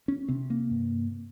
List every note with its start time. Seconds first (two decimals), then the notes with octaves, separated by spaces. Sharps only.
0.08 C#4
0.29 C3 C4
0.50 A#3
0.71 G2